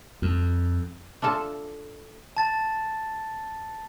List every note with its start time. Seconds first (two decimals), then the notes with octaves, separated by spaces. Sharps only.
0.22 F2
1.22 D4 F4 A4 A5
2.37 A5 A6